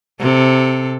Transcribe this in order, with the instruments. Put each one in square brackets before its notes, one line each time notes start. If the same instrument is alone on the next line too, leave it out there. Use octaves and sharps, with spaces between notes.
[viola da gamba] C3 A4